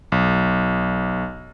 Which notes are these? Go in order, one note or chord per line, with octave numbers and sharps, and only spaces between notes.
B1